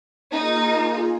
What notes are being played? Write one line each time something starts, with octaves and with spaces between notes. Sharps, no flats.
A#3 D#4 F4 G#4